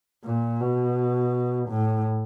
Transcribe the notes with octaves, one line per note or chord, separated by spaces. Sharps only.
A#2
B2
A2